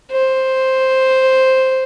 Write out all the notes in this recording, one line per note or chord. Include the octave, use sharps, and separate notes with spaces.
C5